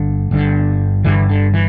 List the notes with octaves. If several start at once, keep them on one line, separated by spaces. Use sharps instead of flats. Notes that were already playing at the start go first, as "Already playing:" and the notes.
Already playing: G1 G2 D3
G1 G2 D3
G1 G2 D3 E3
D3
E3